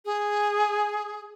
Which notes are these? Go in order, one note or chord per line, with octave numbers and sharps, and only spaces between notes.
G#4